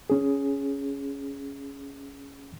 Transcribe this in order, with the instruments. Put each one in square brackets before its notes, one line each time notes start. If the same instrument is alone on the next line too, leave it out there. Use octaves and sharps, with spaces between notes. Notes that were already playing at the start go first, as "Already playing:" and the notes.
[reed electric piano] C#4 G#4